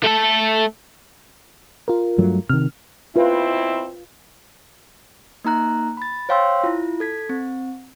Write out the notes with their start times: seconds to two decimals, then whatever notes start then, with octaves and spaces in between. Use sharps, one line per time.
0.04 A3 A4
1.88 F4 A#4
2.18 G2 F#3 A3
2.49 C3 D#3 F6
3.16 B2 C4 E4 F4 B4
5.44 A#3 D#4 A#5 F#6
5.97 B5 A6
6.29 C5 C#5 F5 G5 C6 E6
6.64 E4 F4
7.00 A4 G#6 B6
7.29 C4